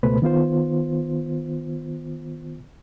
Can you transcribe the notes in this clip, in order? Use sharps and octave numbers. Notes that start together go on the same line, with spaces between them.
C#2 B2 A3 B4 C5 B5
D#3 B3 F4 C5